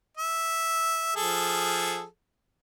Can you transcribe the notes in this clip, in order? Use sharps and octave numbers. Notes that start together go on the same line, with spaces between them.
E5
F3 G#4 A4